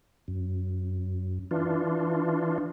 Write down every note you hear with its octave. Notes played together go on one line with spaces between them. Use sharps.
F#2
E3 D4 F4